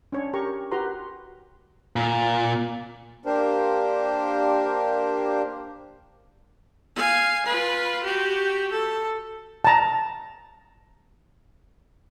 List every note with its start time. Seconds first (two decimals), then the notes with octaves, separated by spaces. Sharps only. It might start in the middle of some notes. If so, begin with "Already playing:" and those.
0.12 C#4 D4 C#5
0.33 G4 A#4 A#5 C#6
0.72 F#4 G4 A#4 B4 A#5 C6
1.96 A#2
3.26 A#3 D4 G4 A#4 C5
6.96 F5 G#5
7.46 F4 B4
8.03 F#4 G4
8.72 A4
9.65 A5 A#5